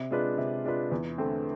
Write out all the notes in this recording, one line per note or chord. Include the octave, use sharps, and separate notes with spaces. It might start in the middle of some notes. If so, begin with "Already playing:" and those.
Already playing: C3
G#3 D4 F4 B4
C3
G#3 D4 F4 B4
E2
D3 A3 C4